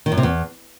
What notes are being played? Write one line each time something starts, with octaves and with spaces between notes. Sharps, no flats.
D#3
F#2
C3
E2